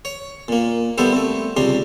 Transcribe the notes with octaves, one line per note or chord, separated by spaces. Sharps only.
C#5
A#2 A#3
G3 B3 E4 A4 C5
A3 C4
C#2 C3 G3 D4 C6